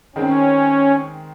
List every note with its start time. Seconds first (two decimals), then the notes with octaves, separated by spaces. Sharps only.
0.16 D#3 G#3 C4 C#4